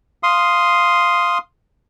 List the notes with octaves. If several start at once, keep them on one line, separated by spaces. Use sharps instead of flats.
F5 C6 D#6